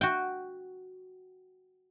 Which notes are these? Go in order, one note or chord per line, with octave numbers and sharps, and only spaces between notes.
F#4 G5